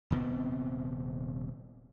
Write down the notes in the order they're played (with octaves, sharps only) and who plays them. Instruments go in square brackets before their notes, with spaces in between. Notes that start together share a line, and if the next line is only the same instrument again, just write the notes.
[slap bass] D#1 C3 B3 C4